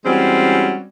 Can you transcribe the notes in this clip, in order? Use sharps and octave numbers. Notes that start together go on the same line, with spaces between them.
E3 G3 G#3 C4 C#4 F#4